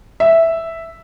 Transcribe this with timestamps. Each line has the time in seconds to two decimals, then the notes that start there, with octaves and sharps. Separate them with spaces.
0.20 E5